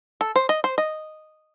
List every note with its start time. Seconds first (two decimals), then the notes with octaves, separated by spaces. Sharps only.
0.21 A4
0.36 C5
0.49 D#5
0.64 C5
0.78 D#5